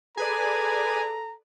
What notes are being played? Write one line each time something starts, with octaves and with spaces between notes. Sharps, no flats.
G#4 A4 B4 D5 G#5 A#5